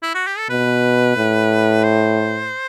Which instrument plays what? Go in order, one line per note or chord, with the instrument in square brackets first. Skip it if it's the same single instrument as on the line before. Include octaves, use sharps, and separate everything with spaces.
[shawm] E4
F#4
G4
A4
[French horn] B2 [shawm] B4
[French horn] A2
[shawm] C5